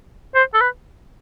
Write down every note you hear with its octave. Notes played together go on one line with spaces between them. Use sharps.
C5
A4
B4